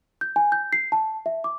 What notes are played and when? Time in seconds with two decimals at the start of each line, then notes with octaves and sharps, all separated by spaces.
0.21 G6
0.36 G#5
0.52 G6
0.73 C7
0.92 A5
1.26 E5
1.44 D6